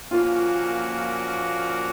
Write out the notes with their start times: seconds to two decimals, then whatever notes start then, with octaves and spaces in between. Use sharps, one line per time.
0.11 A#2 F3 A#3 C#4 F4 F#4